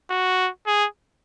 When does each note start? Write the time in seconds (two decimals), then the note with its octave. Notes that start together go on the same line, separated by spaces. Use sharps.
0.10 F#4
0.67 G#4